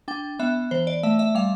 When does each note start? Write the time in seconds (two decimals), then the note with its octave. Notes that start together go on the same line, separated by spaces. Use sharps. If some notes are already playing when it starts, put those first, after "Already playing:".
0.08 D4 G5
0.39 B3 E5
0.71 E3 C5
0.87 D5
1.03 A3 E5
1.19 E5
1.35 G3 F5